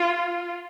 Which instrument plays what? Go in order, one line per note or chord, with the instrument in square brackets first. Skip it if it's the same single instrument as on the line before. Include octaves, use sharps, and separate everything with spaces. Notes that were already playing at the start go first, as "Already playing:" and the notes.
Already playing: [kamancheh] F4